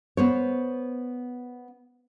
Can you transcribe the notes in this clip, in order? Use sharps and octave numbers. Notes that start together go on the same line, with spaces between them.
B3 C5 C#5